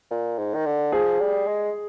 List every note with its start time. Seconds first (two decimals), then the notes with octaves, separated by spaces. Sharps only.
0.11 A#2
0.38 G#2
0.55 D#3
0.66 D3
0.92 F3 G#4
1.20 G3
1.48 G#3